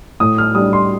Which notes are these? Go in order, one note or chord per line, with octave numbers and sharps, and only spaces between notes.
A2 D#6
F6
G3 D4 D#6
C6